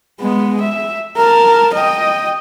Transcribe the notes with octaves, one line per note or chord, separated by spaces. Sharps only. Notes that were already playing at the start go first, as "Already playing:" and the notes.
G#3 B3
E5
A#4 A5
D#5 G5